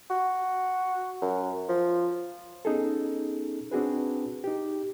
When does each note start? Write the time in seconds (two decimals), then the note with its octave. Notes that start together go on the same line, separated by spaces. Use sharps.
0.10 F#4
1.22 F#2
1.69 F3
2.65 B3 C#4 D#4 G#4 A4
3.72 C4 D4 F#4 G#4 B4
4.44 D#4 G4